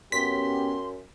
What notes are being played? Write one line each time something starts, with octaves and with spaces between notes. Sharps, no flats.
F#2 B3 C#4 G4 C6 B6